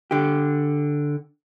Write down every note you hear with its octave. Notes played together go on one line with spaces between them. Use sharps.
D3 G4